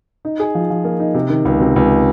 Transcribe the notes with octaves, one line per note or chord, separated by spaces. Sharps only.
D#4
G#4
F3
F3
A#3
D#4
C3
D#3
C#2
C3
C#2